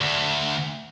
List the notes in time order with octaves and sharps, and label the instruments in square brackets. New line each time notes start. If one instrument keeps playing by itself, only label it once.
[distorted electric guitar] D2